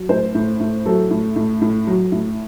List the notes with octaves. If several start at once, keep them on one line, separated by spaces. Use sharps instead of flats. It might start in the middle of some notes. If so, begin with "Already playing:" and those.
Already playing: F#3
A2 C5
A2
A2
F#3 A4
A2
A2
A2
F#3
A2